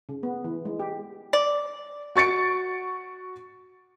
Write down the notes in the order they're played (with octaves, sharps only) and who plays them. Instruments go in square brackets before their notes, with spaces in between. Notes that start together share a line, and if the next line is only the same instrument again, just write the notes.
[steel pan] C#3
B3
E3
G#3
G4
[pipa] D5
[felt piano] F#4 C#6 A6 C#7 D7